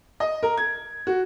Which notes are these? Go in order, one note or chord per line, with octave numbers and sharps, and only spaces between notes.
D#5
A#4
G#6
F#4